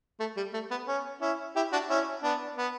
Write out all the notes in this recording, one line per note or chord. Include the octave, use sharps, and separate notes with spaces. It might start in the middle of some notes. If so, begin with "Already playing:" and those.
A3
G3
A3
B3
C#4
C#4 E4
E4 G4
D4 F#4
C#4 E4
B3 D4
B3